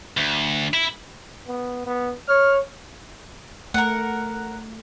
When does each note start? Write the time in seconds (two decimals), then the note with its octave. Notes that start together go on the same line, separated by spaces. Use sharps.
0.17 D2
0.73 E4
1.47 B3
1.87 B3
2.29 C#5 F6
3.74 A3 A#4 F#5